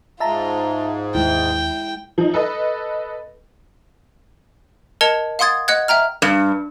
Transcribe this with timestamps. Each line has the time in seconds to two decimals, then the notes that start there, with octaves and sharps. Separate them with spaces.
0.20 G#2 F4 E5 A5 A#5
1.15 D#2 G#3 E4 G5
2.18 F3 D#4
2.34 A4 B4 D#5
5.01 A#4 D#5 A5 G#6 C#7 F7
5.39 F5 F#5 C6 D#6 G#6 A6
5.68 D#5 F#5 F#6 G#6
5.88 E5 G5 A#5 F6
6.22 G2